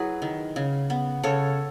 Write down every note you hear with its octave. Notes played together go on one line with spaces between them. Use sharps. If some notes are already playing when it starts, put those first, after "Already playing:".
Already playing: F#3 E4 F#4 G#4 B4
D#3
C#3
B3
C#3 A4 C#5